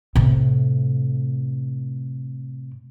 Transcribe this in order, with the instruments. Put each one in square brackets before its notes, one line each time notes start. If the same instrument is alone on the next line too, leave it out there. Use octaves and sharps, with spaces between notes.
[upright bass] A2 C3